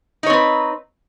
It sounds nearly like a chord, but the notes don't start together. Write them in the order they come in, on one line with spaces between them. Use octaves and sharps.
D#4 C#5 C4 B4